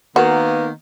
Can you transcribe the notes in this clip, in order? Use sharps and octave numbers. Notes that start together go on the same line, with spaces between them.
D#3 A#3 B3 F#4